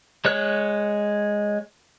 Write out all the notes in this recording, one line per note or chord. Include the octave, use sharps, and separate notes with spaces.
G#3 C#5 F#6